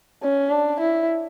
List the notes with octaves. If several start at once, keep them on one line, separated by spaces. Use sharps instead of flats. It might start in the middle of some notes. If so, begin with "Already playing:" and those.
C#4
D4
E4